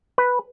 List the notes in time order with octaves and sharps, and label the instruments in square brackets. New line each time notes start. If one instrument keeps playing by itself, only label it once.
[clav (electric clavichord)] B4